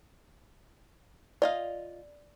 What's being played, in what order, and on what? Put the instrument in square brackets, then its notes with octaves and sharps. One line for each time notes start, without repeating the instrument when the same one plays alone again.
[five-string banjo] F4 D#5 F5 [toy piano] D5